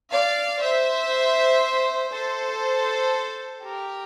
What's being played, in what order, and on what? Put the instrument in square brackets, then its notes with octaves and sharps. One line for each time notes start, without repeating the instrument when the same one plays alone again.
[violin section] D5 F5
C5 E5
A4 C5
G4 A#4